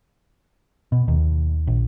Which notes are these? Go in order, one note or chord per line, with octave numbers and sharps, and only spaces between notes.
B2
D#2
A#1